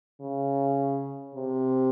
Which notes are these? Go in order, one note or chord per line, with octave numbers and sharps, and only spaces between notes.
C#3
C3